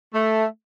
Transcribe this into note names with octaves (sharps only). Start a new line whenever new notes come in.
A3